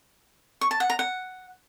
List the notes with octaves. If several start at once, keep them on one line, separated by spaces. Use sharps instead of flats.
C#6
A5
F#5
A#5
F#5